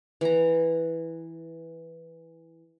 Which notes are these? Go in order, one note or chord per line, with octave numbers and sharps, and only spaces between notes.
E3 A#5